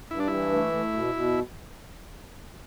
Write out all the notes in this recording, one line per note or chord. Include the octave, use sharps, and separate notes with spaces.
G2 E4
D4
E3 E4
A3
A3
B2
B2